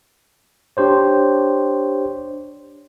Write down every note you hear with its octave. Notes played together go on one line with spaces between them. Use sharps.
D4 G4 C5 C#5